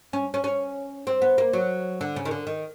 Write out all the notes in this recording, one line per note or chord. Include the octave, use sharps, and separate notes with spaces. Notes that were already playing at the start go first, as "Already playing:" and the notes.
C#4
C#4
C#4
C4
B3
A#3
F#3
D3
C#3
D#3
D3
D#3